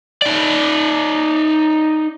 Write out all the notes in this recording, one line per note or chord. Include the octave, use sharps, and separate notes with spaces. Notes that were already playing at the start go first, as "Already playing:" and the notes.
D#4 D5